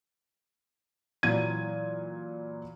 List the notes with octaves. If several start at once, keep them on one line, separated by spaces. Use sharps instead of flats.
A#2 E3 F#3 G#6 D#7